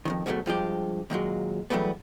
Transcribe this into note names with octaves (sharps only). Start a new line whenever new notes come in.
F2 G#2 D#3
G#2 B2 D#3 E3 F#3 A3
G2 F3 G#3 G4
D#2 A#2 F#3 G#3
E2 D#3 F#3 G3 A3 B3